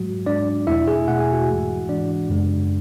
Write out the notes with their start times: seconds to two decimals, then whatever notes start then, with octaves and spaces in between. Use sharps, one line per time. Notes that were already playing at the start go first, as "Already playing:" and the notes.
Already playing: G#2 F#3 G#3 F#4
0.26 G#2 G#3 D4 D5
0.67 E2 B2 A3 E4 E5
0.88 G#4 G#5
1.08 E2 B2 A3 F#5
1.20 G#5
1.32 F#4 F#5
1.48 G#2 E3 G#3
1.88 G#2 E3 G#3 D4 D5
2.29 F#2 C#3 G#3